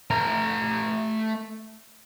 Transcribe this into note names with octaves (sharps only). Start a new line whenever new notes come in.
A3 A#5